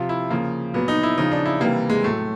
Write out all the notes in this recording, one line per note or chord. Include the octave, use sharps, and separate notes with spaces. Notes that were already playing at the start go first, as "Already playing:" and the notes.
Already playing: C3 F3 F4
E4
C#3 F3 A#3
A#2 F#3 B3
D#4
E4
C#3 F3 D#4
D4
E4
C3 E3 G3 A#3
G#3
A2 F#3 A3